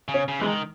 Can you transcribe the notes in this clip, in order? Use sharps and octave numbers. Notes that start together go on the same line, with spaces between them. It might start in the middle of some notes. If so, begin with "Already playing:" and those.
C#3
C#4
C#3
E3 G#3
D#3